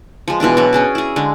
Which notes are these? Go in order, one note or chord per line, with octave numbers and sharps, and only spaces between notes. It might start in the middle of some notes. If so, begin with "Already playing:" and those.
F3 G#3
B2 E3 G#3 D4
F#3 F#4
C#4 G#4 D5
E4 G#4
D3 G#3